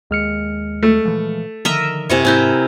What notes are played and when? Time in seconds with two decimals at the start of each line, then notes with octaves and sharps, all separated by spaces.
0.11 D#2 G#3 F6 C#7
0.83 A3
1.05 A#2 E3 F3
1.65 D3 D#3 F3 A#4 D#5 E5
2.10 F#2 C3 E4 C5 D#5 G#5 C#6
2.25 G#2 C4 E4 A#4 G#5 F#6 G6